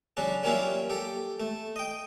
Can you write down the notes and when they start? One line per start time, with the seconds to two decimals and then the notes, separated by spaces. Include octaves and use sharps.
0.17 C#3 F#3 D4
0.43 F#3 G3 A#3 C#4 E4 F4
0.90 G4 A4
1.40 A3
1.76 D#5 G5